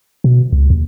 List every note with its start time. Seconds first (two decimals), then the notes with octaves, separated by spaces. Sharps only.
0.24 B2
0.52 C#2
0.70 D#2